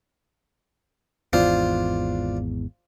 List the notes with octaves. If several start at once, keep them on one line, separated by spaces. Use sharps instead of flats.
G#1 E2 D4 F4 C5